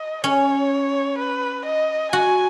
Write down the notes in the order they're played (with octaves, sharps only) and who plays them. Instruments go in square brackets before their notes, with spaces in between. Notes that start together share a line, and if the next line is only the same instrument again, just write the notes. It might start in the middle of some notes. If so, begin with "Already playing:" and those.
Already playing: [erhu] D#5
[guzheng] C#4 [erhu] C#5
[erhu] B4
D#5
[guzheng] F#4 [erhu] G#5